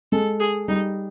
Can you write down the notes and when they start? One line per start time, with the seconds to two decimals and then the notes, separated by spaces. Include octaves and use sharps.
0.12 G#3 A4
0.40 G#4
0.68 G3 D#4